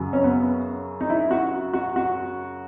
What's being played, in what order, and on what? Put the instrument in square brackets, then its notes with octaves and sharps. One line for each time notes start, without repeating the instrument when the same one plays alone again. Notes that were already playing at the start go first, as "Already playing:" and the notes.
Already playing: [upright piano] F#2 C#3 F#3
[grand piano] C#4
B3
D#4
E4
F#4
F#4
F#4